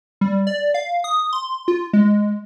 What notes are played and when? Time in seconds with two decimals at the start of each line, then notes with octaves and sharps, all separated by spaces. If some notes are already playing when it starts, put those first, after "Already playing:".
0.21 G3
0.47 D5
0.74 F5
1.04 D#6
1.33 C6
1.68 F4
1.93 G#3